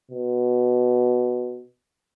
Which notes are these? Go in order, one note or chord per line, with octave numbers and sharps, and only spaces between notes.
B2